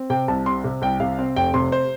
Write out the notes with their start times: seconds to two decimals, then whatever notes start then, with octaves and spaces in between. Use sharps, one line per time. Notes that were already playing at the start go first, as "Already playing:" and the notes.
Already playing: C4
0.10 C3 G5
0.28 C2 A5
0.46 C4 C6
0.64 C3
0.82 C2 G5
1.00 C3 F5
1.19 C4
1.36 F1 G5
1.54 C3 C6
1.72 C5